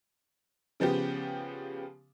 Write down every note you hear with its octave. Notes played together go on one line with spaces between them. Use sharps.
C#3 F3 B3 G4